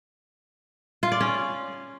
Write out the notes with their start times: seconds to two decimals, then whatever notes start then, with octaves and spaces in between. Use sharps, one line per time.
1.03 F4
1.12 D5
1.20 C#4